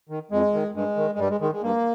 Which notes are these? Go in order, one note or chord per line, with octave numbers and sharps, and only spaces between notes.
D#3
F2 G#3
D#3
G2 G#3
D#3
G#3
G2 G3
G#3
D#3 G#3
G#3
G2 A#3